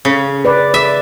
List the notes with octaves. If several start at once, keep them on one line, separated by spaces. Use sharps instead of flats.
C#3
B4 D5
D5 E5